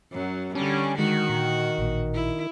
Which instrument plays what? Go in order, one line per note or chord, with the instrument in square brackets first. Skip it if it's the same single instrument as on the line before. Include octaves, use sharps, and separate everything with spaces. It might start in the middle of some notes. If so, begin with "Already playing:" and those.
[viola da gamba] F#2 F#3
[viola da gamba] D3 G3 [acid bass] C#4 [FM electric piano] A5
[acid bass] D#3 [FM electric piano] G#3 [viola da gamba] F#4
[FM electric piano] A#2
A1 A#2
[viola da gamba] E4